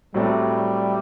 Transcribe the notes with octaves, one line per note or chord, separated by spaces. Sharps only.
A2 F#3 G3 A3 C4